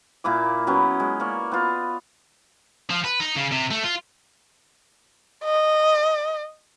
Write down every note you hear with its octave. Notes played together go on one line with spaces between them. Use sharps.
A#2 A#3 E4 D6
F#3 B3 C#4 E4
G#3
A#3 D5 C#6
B3 F4
F3
B4
D#4
C#3
C3
A3
F4
D#5